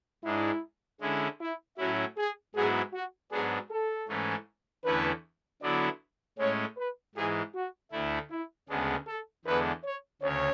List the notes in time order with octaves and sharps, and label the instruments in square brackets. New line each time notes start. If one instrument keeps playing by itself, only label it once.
[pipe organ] G#2 G#3 D4 [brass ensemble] E4
[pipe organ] D3 G#3 C#4 E4
[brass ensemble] E4
[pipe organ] A2 F#3 C#4 E4 [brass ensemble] F#4
[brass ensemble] G#4
[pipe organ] G#2 F#3 B3 E4 [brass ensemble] G#4
[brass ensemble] F#4
[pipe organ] G#2 F#3 B3 D4 [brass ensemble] G#4
[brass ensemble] A4
[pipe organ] G#2 E3 A3 C#4
[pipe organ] E2 D3 A3 C#4 E4 [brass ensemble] B4
[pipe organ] D3 F#3 B3 E4 [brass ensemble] D5
[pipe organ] A2 G#3 C#4 [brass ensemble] C#5
[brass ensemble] B4
[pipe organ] G#2 E3 G#3 [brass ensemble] G#4
[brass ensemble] F#4
[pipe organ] D2 D3 A3 E4
[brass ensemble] E4
[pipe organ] D2 C#3 G#3 B3 D4 [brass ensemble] G#4
[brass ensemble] A4
[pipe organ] E2 D3 G#3 B3 D4 [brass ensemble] B4
[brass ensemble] C#5
[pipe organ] D2 C#3 [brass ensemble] C#5